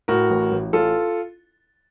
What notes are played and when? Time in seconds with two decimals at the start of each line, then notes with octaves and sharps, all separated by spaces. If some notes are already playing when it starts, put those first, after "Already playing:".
0.08 A2 F#4 A#4
0.30 A1
0.52 A1
0.73 A1 F4 A4